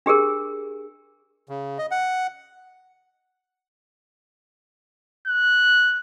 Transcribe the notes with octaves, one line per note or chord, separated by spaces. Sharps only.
D4 G4 G#4 A#4
C#3
D#5
F#5
F#6